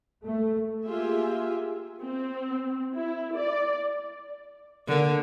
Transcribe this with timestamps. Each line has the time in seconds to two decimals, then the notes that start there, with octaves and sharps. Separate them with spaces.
0.25 A3
0.86 A#3 F4 G4 G#4 E5 G#5
2.02 C4
2.95 E4
3.37 D5
4.87 D3 A#3 A#4